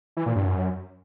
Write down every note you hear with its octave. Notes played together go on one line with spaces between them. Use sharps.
E3
A#2
G2
F#2